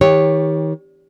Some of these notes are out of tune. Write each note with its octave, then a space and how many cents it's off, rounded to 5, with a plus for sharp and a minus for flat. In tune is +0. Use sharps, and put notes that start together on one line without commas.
D#3 +40 G4 +15 C#5 -5